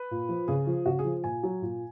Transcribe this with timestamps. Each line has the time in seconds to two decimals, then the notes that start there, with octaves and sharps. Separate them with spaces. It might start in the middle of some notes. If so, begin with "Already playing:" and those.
Already playing: B4
0.11 A#2
0.29 F3
0.48 C#3 G#4
0.67 F3
0.86 C#3 F#4
0.99 G#4
1.05 F3
1.24 A#2 G#5
1.43 F#3
1.62 A#2